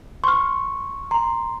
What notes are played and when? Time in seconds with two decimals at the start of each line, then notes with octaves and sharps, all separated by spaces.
0.24 C6 C#6 F6
1.11 A#5 C6